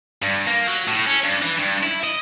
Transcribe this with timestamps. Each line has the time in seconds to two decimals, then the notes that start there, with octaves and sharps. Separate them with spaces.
0.23 G2
0.47 A#3
0.68 F#3
0.88 A2
1.06 C#4
1.24 G2
1.42 E3
1.59 G2
1.83 E4
2.04 D#5